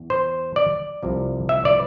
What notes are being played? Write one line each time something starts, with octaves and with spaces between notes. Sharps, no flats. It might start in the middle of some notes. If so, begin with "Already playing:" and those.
Already playing: E2
C5
D5
C2 C3 F3
E5
D5